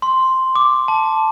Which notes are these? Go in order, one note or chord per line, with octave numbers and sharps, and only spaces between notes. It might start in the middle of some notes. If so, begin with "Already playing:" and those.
C6
D6
A5